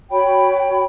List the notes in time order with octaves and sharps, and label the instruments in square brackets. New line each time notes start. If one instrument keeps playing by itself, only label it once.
[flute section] F#4 C#5 G5 B5